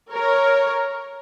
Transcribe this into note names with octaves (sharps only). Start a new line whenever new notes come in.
A#4 C#5